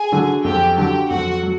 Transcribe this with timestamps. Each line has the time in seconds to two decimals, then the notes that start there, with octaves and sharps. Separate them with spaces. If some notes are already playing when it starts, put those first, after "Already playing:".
Already playing: G#4 G#5
0.12 D3 F#3
0.44 F2 G4 G5
0.77 D3 F#3 G4 G5
1.10 F2 F#4 F#5
1.43 F#3